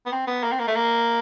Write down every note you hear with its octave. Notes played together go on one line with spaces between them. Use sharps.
B3
C4
B3
A#3
C4
A#3
A3
A#3